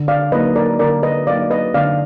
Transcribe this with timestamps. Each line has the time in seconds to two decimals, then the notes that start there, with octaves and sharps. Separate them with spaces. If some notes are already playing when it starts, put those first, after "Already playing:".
Already playing: D3
0.08 D5 F5
0.32 F#3 A#3 D#4 B4 D#5
0.56 A#4 D5
0.79 D3 A#4 D5
1.03 B4 D#5
1.27 F#3 A#3 D#4 D5 F5
1.50 B4 D#5
1.74 D3 D5 F5